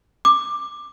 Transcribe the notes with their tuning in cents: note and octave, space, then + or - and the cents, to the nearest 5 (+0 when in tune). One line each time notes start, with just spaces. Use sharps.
D6 +15